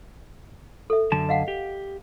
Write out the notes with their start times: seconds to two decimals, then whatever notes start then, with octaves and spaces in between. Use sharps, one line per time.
0.90 A4 E5
1.12 F#2 D3 A5
1.29 D#5 F5 F#5
1.48 G4